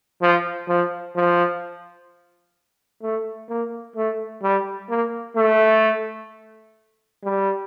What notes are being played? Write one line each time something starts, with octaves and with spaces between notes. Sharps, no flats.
F3
F3
F3
A3
A#3
A3
G3
A#3
A3
G3